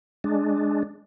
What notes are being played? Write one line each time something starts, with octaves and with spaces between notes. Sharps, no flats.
G#3 D4